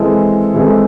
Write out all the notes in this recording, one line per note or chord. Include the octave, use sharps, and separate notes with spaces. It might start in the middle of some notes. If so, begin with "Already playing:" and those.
Already playing: E3 G#3 C4 E4 A4
E3 G#3 C4 E4 A4